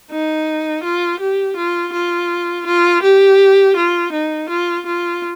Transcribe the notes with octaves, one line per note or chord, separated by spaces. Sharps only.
D#4
F4
G4
F4
F4
F4
G4
F4
D#4
F4
F4